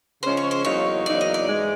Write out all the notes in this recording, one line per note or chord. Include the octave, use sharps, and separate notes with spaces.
C#3 F3 G#3 C#4 C5
C#5
C5
E2 C#3 F#3 A#3 D#4 C#5
E2 C#3 F#3 A#3 D#4 D5
D#5
D5
G#2 E3 G#3